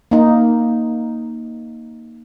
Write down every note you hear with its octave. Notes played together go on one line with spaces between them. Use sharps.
A#3 D#4